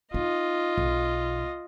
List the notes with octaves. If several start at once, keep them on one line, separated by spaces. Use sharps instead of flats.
D#4 F4 D#5
B1